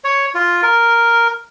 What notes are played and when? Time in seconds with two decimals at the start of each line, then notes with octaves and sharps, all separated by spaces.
0.04 C#5
0.34 F4
0.63 A#4